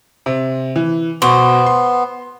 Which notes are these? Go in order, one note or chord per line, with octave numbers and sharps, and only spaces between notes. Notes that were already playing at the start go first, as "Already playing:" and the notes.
C3
E3
B2 B3 C5
C6